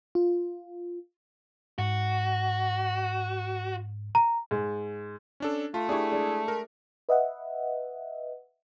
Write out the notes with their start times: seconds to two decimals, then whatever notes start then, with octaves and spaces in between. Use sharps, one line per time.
0.15 F4
1.79 G#2 F#4
4.15 A#5
4.51 G#2
5.40 C#4 D4 A4
5.74 A3 F4
5.89 D4 E4 G4 G#4 C#6
6.12 G#3 D4
6.48 A#4
7.09 B4 D#5 E5 F#5